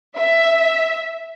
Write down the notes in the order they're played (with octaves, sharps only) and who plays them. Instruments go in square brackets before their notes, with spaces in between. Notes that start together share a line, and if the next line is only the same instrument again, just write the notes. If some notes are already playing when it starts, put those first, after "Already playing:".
[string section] E5